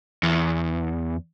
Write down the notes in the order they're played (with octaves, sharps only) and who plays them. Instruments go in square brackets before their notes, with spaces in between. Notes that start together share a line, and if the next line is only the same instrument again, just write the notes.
[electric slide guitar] E2